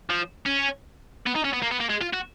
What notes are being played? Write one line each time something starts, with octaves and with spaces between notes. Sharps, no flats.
F3
C#4
B3
D#4
C#4
B3
A#3
B3
A#3
G#3
F4
F#4